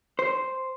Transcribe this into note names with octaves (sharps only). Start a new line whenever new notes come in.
C5